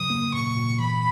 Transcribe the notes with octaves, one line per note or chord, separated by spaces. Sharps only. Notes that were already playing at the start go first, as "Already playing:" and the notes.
Already playing: C#3 F#3 D#6
A#3
A#2 C#6
A#2
E3 B5